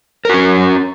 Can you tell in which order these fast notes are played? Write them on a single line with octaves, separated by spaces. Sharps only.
A#4 F#4 C#4